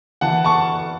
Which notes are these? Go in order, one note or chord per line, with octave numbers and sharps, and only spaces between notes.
E3 F#5 A5
A5 C#6